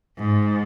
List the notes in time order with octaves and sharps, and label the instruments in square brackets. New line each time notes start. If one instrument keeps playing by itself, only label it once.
[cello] G#2